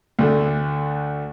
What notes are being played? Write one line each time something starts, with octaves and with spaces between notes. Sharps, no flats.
D2 D3 A3